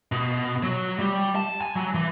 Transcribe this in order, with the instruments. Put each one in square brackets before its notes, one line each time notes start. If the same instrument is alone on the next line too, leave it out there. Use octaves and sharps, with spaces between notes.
[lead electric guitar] B2
F#3
G3
A5
G#5
F#3
E3